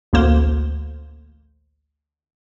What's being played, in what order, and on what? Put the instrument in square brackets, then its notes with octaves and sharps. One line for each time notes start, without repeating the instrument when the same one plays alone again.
[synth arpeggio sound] A1 D2 A#3 C5